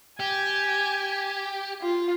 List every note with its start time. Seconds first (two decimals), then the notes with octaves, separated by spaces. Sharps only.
0.20 G4 G#5
1.82 F4